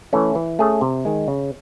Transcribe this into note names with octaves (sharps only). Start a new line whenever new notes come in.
E3 A3 C#4
E3
A3 C#4 G#4
C3
D#3 G#3
C#3